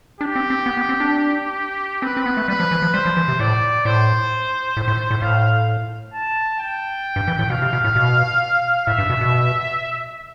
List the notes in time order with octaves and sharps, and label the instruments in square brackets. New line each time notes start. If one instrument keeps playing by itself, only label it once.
[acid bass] D4 [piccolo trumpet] G4
[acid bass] C4
C4
B3
B3
C4
D4
[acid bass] C4 [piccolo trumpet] B4
[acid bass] C4
B3
A3
[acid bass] G3 [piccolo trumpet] B4
[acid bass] F3
E3
F3
[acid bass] G3 [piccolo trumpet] C5
[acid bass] F3
E3
C3
[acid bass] A2 [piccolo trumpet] D5
[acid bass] A2 [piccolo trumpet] C5
[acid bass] A2
A2
A2
[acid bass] A2 [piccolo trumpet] F5
[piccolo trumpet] A5
G5
[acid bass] G2
E3
A2
[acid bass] B2 [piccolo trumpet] F5
[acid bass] C3
B2
A2
B2
[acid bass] A2 [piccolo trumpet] E5
[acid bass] G2
B2
B2